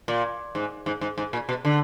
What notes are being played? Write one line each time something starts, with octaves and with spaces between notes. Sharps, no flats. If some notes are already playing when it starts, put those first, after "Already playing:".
A#2
G#2
G#2
G#2
G#2
A#2
B2
D3